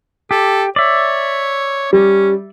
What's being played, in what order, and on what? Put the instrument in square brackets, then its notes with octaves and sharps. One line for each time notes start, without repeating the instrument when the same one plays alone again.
[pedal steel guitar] G4 [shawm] A4
[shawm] C#5 [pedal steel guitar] D5 E5
[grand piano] G3 [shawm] C#4